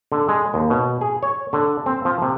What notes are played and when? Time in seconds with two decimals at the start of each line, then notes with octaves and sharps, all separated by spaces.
0.12 D3
0.29 G#3
0.54 D#2
0.70 B2
1.01 G#4
1.23 C#5
1.53 D3
1.86 C4
2.05 F3
2.22 C3